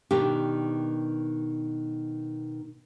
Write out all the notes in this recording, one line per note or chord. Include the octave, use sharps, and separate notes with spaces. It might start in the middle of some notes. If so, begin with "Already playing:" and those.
B2 D#3 D4 G4